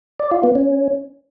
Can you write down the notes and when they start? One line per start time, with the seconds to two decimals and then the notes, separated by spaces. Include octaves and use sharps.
0.19 D5
0.31 F4
0.43 B3
0.55 C#4